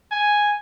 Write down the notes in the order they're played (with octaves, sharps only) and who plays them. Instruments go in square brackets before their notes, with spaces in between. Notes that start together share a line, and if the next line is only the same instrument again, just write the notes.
[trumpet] G#5